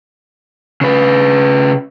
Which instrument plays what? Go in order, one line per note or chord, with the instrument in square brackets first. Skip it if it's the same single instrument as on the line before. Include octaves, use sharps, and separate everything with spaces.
[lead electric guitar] C#3 B4